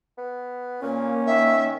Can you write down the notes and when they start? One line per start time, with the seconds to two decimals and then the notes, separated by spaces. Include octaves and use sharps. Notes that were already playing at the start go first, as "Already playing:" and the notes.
0.18 B3
0.82 A#2 A#3 C#4
1.26 D#3 E5